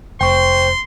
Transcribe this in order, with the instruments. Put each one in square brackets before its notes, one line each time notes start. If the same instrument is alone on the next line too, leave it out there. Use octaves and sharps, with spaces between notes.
[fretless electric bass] F1 [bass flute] C5 [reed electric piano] G5 C#6 [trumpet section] C6